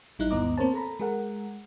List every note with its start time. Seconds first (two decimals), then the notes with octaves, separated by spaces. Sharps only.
0.19 A1 G3 D#4 E4 F#6
0.31 D#2 G#2 B3 D#5 A#5 D6
0.58 A#3 C4 A#4 C5 C#5 A5
0.74 A4 A#5 B5
1.00 G#3 G#4 A#4 F#5